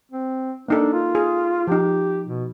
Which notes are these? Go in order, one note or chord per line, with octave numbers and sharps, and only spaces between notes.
C4
A#3 D4 D#4 A4
F4
G#4
F3 D#4 G4
B2